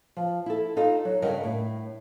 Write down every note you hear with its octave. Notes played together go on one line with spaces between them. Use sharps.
F3
E4 A4
D#4 F4 A4 D#5
F#3
G2 C#3 A#4 D#5 F#5 G5
A2